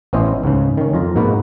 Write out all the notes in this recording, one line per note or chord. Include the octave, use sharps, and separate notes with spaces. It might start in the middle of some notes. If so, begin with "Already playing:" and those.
A1 B3 C#4 E4 C5 D#5
C#2 G#2 C#3
D#3 C#4
F2 F4 A#5
G#2 B2 A#3 F#4 B4